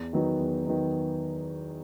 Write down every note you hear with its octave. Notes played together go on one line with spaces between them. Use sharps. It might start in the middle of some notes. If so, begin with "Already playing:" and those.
Already playing: E2
D#3 F#3 B3 D#4
E2
D#3 F#3 B3 D#4